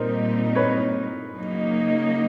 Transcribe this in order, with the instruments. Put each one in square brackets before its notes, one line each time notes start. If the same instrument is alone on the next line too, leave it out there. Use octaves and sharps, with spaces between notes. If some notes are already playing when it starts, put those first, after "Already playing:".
Already playing: [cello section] A#2 G3 C4 D#4 [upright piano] A#4 C5
[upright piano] B4 C#5
[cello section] C#3 F#3 A#3 D#4